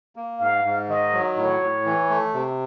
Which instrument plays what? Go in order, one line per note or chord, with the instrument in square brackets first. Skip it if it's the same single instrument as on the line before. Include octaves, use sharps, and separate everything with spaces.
[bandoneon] A#3
[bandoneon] G#2 [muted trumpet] F5
[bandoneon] G#2
[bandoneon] D#3 [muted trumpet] D#5
[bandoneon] F#3
[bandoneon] A2 [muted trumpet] C#5
[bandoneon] A2
E3
A3
C3